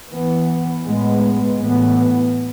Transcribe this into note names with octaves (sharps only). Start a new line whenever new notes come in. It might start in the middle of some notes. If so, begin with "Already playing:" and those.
E3 B3
A2 G#3 B3
A2 E3 B3